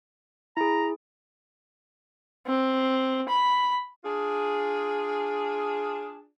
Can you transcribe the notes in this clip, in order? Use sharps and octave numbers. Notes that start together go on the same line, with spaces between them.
E4 G#4 A#5
C4
B5
D4 F4 G#4